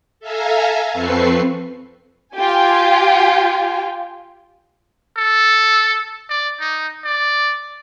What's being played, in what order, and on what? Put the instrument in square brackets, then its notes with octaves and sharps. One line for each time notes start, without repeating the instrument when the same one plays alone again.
[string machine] A4 E5 F5 G#5 A#5
F2 C4 A4 B4 C#6 C7
[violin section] F4 G4 G5 G#5
[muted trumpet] A4
D5
D#4
D5